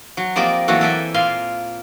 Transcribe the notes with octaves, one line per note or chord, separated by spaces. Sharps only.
F#3
F3 A#3 C4 G4 D5 D#5
E3 F#3 A#3 F#4 A4
A4 D5 E5 G5 G#5
A#2 F5 G#5 C6